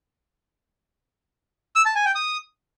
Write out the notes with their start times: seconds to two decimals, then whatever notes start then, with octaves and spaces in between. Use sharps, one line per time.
1.76 E6
1.86 A5
1.95 G#5
2.05 G5
2.15 D#6